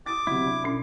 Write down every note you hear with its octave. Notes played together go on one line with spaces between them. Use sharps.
D6 D#6 A6
C3 F#3 E4
D4
B2 C#4